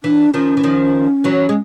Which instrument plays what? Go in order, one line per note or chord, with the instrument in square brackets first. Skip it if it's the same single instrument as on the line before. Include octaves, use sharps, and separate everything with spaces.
[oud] E3 [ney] D4
[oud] D#3 F3 [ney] C#4
[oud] E3
D#3 F3
E3 F#3
G#3